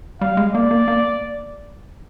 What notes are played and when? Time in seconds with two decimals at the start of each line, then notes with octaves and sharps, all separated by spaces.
0.21 G3 F5
0.37 G#3
0.54 A#3 D5
0.71 A#3
0.88 A#3